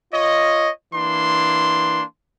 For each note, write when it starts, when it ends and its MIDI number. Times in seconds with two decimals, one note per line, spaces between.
0.13 0.69 65
0.13 0.69 73
0.13 0.69 75
0.94 2.03 52
0.94 2.03 58
0.94 2.03 62
0.94 2.03 84